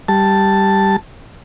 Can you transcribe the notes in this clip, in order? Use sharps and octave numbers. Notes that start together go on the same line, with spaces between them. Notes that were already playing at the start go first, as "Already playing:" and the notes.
G3 A5